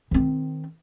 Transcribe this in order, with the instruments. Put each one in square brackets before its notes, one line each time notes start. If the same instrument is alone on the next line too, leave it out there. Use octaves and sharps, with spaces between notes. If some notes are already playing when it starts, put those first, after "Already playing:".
[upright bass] D#3 C4